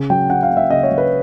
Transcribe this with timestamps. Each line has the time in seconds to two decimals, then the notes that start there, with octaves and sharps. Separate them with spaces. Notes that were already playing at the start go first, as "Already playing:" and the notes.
Already playing: C#3
0.10 F#3 G5
0.30 C#3 F#5
0.43 F5
0.50 A#3
0.57 E5
0.70 C#3 D#5
0.83 C#5
0.91 F#3
0.98 B4